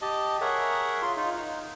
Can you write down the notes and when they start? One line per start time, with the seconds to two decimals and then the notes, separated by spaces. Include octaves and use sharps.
0.02 G4 D#5 A5
0.41 G#4 A#4 C#5 E5 F#5
1.02 F4 C6
1.16 D#4 F4
1.36 D#4